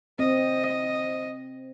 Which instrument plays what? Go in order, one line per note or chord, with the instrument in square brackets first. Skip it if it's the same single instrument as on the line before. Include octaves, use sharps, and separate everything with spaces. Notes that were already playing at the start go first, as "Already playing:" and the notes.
[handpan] C4 [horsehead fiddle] D#5